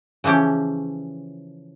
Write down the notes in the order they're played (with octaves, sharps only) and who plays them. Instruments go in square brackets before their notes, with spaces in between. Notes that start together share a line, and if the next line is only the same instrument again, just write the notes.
[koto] C#3 E3 F3 C#4 G4